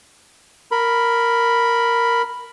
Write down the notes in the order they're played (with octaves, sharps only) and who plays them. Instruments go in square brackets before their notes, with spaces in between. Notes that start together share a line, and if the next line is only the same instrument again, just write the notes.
[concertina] A#4 B5